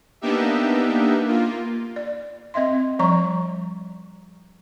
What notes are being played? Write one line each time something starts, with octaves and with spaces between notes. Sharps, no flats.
A#3 B3 D4 D#4 G4 E5
A#3 F4
D5
C4 D#5 E5 C6
F3 G3 D5 A#5 C#6